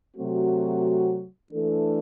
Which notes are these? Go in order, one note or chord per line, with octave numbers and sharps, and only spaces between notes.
C3 F#3 A3 C4 F#4
E3 A3 D4 A4